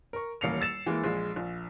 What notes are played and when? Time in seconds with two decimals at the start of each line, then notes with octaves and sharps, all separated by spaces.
0.13 A#4 C#6
0.41 D#1 A1 A#3 C7 C#7 F7
0.61 E6 A6 E7
0.86 E3 G#3 A#3
1.04 A#1 G#3
1.36 A#1